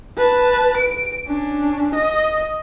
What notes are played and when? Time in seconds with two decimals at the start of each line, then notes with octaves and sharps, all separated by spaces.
0.18 B4 A5
0.77 D7
1.28 C#4 D4
1.96 D#5